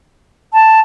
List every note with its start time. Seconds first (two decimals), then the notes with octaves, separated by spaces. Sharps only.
0.53 A5